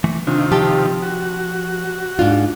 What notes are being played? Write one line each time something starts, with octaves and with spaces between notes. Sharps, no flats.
E3 A3
C3 D#3 D4 F4
F3 G4 A5 C6
F#4
G#2 D4 F4